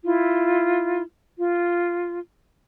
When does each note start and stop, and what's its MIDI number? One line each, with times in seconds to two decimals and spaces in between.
0.04 1.03 64
0.04 1.03 65
1.39 2.18 65